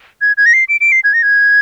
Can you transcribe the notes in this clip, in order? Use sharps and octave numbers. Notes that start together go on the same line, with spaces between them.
G#6
G#6
A#6
C7
D7
D7
C7
G#6
A#6
G#6